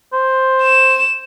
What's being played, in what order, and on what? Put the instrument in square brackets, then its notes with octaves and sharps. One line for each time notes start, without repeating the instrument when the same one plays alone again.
[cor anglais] C5
[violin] E7